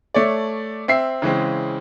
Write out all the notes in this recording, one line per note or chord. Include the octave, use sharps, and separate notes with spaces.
A3 C#5 D5
C4 E5 C7
C#3 E3 G#3 C4